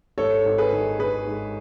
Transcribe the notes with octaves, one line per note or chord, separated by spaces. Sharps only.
G#1 A4 C#5
G#1
G#4 B4
D#3
D#3 G#4 B4
G#2